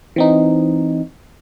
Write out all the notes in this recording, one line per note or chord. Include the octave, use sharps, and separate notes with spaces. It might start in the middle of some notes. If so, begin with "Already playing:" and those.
E3 C4 D#4